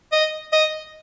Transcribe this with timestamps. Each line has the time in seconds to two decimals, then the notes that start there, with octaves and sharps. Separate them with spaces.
0.12 D#5
0.52 D#5